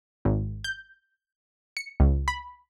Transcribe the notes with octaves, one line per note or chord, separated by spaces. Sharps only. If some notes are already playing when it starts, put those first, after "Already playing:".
G#1
G6
C#7
C#2
B5